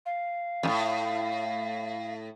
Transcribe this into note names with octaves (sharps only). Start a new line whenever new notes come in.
F5
F2 A2